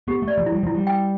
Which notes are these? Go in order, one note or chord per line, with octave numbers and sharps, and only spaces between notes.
B3 G4
A3
D5
F3
E4
G3
F3 E4
G3
G5